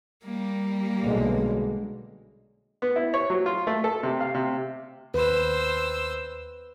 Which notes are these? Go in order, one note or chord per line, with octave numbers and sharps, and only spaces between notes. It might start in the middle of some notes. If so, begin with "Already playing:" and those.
G3 A#3
B1 D3 G#3
B3
E4
C#5
F#3
F4
A3
A4
C3
F5
C3
D#2 B4 C5 E6